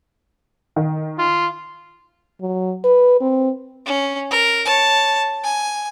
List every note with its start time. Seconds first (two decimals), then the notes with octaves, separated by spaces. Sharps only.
0.76 D#3
1.19 F4
2.41 F#3
2.84 B4
3.21 C4
3.85 C#4
4.31 A#4
4.66 C#5 A5
5.44 G#5